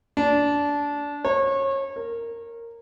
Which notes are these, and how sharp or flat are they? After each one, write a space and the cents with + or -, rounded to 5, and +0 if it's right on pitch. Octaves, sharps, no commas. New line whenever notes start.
D4 -20
C#5 -30
A#4 -10